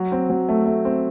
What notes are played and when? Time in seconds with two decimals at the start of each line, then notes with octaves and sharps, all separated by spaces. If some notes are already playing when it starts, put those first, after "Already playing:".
Already playing: F#3
0.12 C4
0.30 F#3
0.49 A3
0.66 A3
0.85 C4